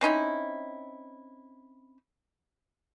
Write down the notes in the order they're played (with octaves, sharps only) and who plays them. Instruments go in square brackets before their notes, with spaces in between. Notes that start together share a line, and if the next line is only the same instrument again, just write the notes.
[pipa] C4 C#4 D#4 E4